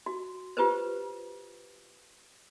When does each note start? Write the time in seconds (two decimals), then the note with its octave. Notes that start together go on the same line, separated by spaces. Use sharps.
0.06 F#4
0.57 F4 G4 B4 C5